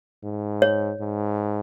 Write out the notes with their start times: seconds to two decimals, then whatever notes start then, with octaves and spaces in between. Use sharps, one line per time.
0.24 G#2
0.62 C#5
1.00 G#2